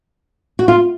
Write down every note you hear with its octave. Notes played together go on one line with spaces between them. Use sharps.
F#4
F4